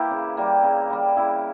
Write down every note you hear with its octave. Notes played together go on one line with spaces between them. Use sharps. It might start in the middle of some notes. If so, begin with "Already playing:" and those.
Already playing: E3 A#3 E4 G4
C#3
G3 A#3
C#3
G3 A#3
C#3 E4